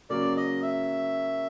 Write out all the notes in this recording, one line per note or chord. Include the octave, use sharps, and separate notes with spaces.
C#3 F#3 A#3 D5
D#5
E5